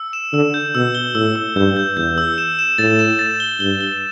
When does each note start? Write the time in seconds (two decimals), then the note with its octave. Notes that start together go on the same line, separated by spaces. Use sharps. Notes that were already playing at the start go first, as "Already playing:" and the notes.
Already playing: E6
0.13 E7
0.33 D3 E6
0.54 G6
0.75 B2 E6
0.95 G7
1.15 A2 E6
1.36 E6
1.56 G2 G6
1.77 G6
1.97 E2 G6
2.18 E6
2.38 E7
2.59 E7
2.78 A2 A6
2.99 E7
3.19 A6
3.40 G7
3.60 G2 G7
3.81 G7